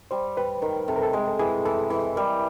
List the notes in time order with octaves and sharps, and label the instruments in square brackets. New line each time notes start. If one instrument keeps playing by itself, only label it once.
[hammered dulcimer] G3 [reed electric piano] C5
[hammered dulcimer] G3 [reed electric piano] B4
[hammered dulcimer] D#3 [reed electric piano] A#4
[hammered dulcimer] C3 [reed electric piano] A4
[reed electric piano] A#4
A4
[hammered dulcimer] G#3 [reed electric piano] G#4
[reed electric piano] A4
[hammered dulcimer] E3 [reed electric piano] G#4
[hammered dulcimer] E3 [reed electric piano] A4
[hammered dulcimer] E3
[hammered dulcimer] G3 [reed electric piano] A#4